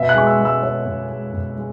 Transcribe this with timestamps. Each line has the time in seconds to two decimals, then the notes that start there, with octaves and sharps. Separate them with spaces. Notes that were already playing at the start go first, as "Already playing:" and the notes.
Already playing: B2 E5
0.09 F#6
0.15 G#3 C#6
0.27 E6
0.39 G#3
0.45 E6
0.62 G#3 C#5
0.86 B2
1.10 G#3
1.33 B2
1.57 G#3